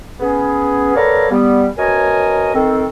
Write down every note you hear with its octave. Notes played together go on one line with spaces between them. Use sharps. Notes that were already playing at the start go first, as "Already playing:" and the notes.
B3 C#4 G#4
B3 A4 A#4 C#5 D5 F5
G3 B3
F#2 B2 A#4 C#5 D#5 G#5
D#3 C4 A4